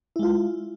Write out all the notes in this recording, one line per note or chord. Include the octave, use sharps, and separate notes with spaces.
G#3 E4 F4